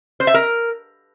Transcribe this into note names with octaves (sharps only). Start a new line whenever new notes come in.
C5
E5
A#4